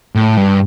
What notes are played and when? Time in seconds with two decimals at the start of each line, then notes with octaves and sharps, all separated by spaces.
0.15 A2
0.37 G2